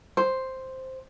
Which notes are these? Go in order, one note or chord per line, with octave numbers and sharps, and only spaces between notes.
C5